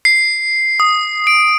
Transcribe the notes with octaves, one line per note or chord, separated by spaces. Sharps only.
C7
D#6
D7